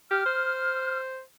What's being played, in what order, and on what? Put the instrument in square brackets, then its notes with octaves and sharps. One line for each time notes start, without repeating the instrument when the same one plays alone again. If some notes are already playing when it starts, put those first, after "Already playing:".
[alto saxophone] G4 [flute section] F6
[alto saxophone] C5